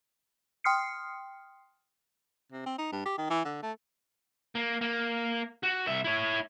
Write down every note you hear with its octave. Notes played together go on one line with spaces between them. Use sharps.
G5 C6 D#6 F6 C7 C#7
C3
C4
D#4
G2
G4
D#3
E3
D3
A3
A#3
A#3
F#4
C2 E5
E4 C#5